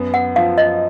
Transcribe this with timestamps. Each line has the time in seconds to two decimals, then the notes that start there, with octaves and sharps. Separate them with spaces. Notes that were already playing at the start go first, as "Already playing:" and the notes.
Already playing: F#2 B3
0.14 F#5
0.36 F3 F5
0.58 D#5